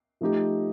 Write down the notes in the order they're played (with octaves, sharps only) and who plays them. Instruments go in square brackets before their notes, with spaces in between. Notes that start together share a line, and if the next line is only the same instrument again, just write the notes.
[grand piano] F3 A3 D#4 G4